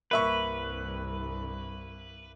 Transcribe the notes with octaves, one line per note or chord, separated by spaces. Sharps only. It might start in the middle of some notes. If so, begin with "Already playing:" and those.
C2 G2 A#3 B4 E5 C#6